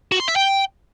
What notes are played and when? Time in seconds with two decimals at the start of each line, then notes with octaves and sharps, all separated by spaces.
0.12 F#4
0.20 C6
0.28 E5
0.36 G5